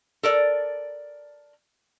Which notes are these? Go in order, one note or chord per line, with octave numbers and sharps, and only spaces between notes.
A4 A#4 D5